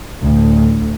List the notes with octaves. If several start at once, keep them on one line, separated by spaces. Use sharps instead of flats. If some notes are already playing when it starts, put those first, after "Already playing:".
D2 A2